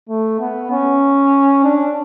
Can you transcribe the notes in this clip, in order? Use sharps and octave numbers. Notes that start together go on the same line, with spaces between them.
A3
B3
C#4
D4